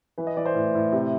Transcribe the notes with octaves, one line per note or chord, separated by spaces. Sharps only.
E3 B4
D#5
E3 D5
C5
A2
A2
C3